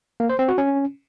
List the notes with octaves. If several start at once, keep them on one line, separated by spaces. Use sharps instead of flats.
A#3
C5
C4
F#4
C#4